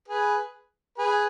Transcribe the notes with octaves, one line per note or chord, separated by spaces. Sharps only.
G#4 B4
G#4 B4